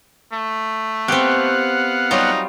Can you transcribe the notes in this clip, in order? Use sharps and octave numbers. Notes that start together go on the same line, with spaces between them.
A3
B3 C4 G4 F5 F#5
F#3 G3 D#4 F4